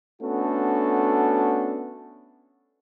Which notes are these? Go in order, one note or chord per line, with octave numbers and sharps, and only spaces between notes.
A3 B3 C#4 D4 F#4 A4